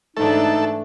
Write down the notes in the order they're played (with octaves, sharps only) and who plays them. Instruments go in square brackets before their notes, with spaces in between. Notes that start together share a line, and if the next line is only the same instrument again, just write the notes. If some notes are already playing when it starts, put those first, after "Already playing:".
[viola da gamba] G#2 E3 D4 [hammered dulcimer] A3 [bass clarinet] D#4 [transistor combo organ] A4